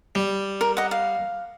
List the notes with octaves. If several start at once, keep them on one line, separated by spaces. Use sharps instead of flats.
G3
A#4
D#5 F#5
F5